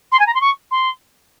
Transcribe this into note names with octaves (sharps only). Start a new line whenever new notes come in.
C6
G#5
A#5
C6
C#6
C6